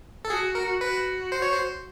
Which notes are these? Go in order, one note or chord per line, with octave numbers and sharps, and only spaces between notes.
A4
F#4 G#4
A#4
F#4 B4
C5
C#5
C5